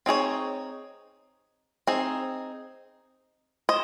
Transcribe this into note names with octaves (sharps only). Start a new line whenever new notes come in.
C4 D#4 G#4 C#5
C4 D#4 G#4
C5 D#5